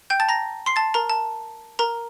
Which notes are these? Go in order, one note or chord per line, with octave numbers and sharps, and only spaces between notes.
G5 G6
A5 A6
A#5 A#6
C6 C7
A5 A6
A#4 A#5
A5
A#4 A#5